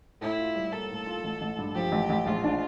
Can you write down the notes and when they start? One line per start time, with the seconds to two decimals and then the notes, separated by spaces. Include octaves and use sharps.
0.21 A2 E4
0.39 F4
0.55 G3
0.72 A#3 A4
0.90 A2
1.07 F4
1.24 A1
1.41 A1
1.58 G2
1.75 F3 G4
1.92 A1
2.10 A1
2.26 A#1 F4
2.44 D4